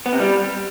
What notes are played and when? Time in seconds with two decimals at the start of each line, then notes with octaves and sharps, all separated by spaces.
0.06 B3
0.13 C3
0.20 G3